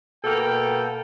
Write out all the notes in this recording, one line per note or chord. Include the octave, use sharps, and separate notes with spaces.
B2 A#3 A4 G5